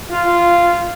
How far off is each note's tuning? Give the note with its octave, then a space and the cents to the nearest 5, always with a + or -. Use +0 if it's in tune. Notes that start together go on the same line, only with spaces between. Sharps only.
F4 -10